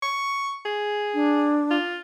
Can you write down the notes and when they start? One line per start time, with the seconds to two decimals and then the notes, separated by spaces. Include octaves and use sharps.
0.03 C#6
0.66 G#4
1.14 D4
1.71 F4